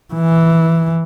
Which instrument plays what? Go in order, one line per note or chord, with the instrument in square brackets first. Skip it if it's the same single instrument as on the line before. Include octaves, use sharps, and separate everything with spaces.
[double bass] E3